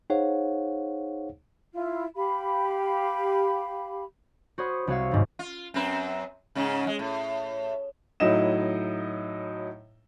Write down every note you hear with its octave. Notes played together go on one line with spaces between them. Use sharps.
D#4 G#4 C5 C#5 F5 F#5
E4 F4
G4 F5 B5
F#4 C5 C#5 B5 D#6
C2 F#4 C#5 F5 E6
D#2 G#2
F4
F#2 C4 B4
G#2 C#3 C#4
G#3
A2
A2 F#3 D#4 E4 D#5 E7